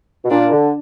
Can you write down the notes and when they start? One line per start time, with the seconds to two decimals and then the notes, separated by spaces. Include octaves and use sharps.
0.25 B2
0.30 A#2 D4
0.51 D3